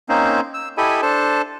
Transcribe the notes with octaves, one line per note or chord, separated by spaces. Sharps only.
A#3 C4 C#4 D#4 C5
E6
E4 G4 A4 D#5 G#5 B5
D4 A4 C5 A5